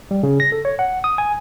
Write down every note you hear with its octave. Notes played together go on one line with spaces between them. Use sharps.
G3
C#3
A#6
A4
C#5
F#5
D#6
G#5